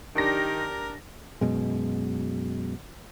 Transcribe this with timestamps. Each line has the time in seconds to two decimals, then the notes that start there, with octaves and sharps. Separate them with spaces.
0.15 D#3 D4 G4 A#4 A#6
1.41 F#2 B2 G#3